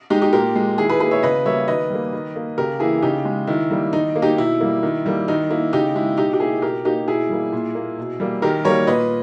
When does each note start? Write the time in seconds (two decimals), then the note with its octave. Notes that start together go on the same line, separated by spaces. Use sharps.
0.10 G#3 D#4 G4
0.22 D#4 G4
0.33 A#2 G4 A#4
0.56 G#3
0.78 D#3 E4 G#4
0.89 G#4 B4
1.00 A#3 G#4 B4
1.11 C#5 E5
1.23 C#3 B4 D#5
1.45 G3 A#3 C#5 E5
1.67 D#3 B4 D#5
1.90 G3 A#3
2.13 D#3
2.36 A#3
2.58 C#3 G4 A#4
2.80 E3 A#3 E4 G#4
3.02 C#3 D#4 G4
3.25 G#3
3.47 D#3 E4
3.71 G3 A#3
3.93 D#3 D#4
4.16 A#3
4.22 D#4 G4
4.38 B2 E4
4.61 G3 A#3
4.83 D#3
5.06 G3 A#3
5.28 D#3 D#4
5.50 A#3 E4
5.73 C#3 D#4 G4
5.95 G#3 E4
6.17 B2 D#4 G4
6.33 G4
6.40 A#3 E4 G#4
6.62 B2 G4 A#4
6.85 A#3 D#4 G4
7.08 B2 E4 G#4
7.30 G3 A#3
7.52 A#2
7.75 A#3
7.98 B2
8.20 G3 A#3
8.42 D#3 G4 A#4
8.65 G3 A#3 A#4 C#5
8.87 A#2 B4 D#5